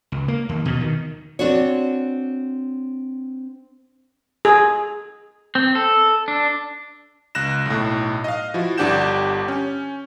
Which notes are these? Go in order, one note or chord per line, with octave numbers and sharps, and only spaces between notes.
C#2
A#3
D#2
B2
D#3
C4 D4 F#4 C#5
G#4
C4
A4
D4
C#2 F#6 A#6 E7
B1 A2
D#5 F5
F3 E4 F#4
G1 D4 G4 F#5 G6 E7
C#4